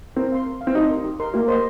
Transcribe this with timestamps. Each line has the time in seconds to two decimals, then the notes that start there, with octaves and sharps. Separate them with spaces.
0.16 C4 A#4
0.32 F5 C6
0.47 A#4
0.61 F5 C6
0.67 C4
0.75 D#4 G4
0.91 A#4 D#5 C6
1.04 G4
1.20 A#4 D#5 C6
1.34 A#3 G4
1.48 C5 D#5 C6